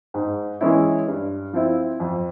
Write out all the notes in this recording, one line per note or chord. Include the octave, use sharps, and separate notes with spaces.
G#2
E3 G#3 C#4 E4
G2
F3 C4 E4
F2